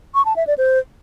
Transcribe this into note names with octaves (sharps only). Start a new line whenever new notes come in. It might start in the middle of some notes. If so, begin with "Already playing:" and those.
C#6
A5
E5
D5
C5